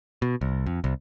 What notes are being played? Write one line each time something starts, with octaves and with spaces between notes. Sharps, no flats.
B2
C2
F2
C2